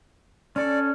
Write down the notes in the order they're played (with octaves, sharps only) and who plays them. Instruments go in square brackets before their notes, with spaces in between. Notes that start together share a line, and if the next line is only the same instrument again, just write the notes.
[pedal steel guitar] C#4 A4 [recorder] D5